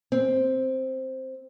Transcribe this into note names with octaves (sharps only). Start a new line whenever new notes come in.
C4